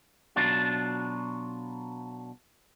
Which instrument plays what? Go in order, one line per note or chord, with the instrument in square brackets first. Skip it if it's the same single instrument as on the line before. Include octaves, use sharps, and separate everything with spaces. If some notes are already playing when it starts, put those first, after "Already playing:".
[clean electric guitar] B2 F#3 D4 F4